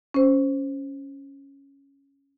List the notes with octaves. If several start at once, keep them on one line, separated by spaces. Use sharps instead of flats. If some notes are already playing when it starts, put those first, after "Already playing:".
C#4 C5